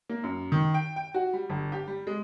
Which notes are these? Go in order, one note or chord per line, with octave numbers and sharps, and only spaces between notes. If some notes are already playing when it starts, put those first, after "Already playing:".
A#3
F#2
D#3
G5
G5
F#4
G3
G1
G4
G3
G#3